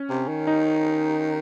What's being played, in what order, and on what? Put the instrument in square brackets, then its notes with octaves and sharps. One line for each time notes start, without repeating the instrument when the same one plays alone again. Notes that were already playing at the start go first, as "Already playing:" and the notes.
Already playing: [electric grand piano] C#4
[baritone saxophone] C3
D#3
[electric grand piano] D#4